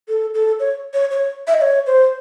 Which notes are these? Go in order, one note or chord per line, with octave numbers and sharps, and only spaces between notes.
A4
A4
C#5
C#5
C#5
E5
D#5
C#5
C5